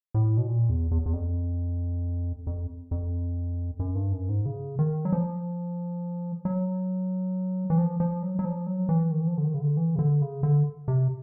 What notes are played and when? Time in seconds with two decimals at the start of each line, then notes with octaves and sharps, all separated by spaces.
0.14 A2
0.37 B2
0.47 A#2
0.69 E2
0.91 E2
1.06 E2
1.13 F2
2.47 F2
2.91 F2
3.79 F#2
3.95 G2
4.12 F#2
4.29 G#2
4.46 C#3
4.79 D#3
5.05 F#3
5.12 F3
6.45 F#3
7.70 E3
7.78 F3
8.00 F3
8.22 F#3
8.39 F#3
8.45 F3
8.67 F#3
8.89 E3
9.11 D#3
9.21 E3
9.27 F3
9.38 D3
9.44 D#3
9.54 C#3
9.61 D3
9.77 E3
9.96 C#3
9.99 D3
10.21 C#3
10.43 D3
10.88 C3